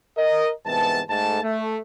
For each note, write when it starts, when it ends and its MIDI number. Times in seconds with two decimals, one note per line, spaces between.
0.17 0.50 70
0.17 0.50 75
0.66 1.02 36
0.66 1.02 44
0.66 1.02 52
0.66 1.02 59
0.66 1.02 81
1.10 1.42 44
1.10 1.42 57
1.10 1.42 81
1.43 1.79 57